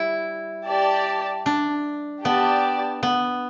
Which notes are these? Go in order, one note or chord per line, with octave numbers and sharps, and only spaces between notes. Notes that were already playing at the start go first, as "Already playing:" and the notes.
Already playing: G3 E4
G4 D5 A5
D4
B3 G4 D5 A5
B3